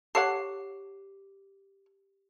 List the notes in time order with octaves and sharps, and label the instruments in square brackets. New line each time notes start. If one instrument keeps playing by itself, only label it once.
[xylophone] G4 C7 [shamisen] A4 C#5 F#5